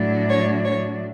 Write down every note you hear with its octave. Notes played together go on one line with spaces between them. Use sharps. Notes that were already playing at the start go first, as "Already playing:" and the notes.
Already playing: A2 F#3 A3 D4
C#5
C#5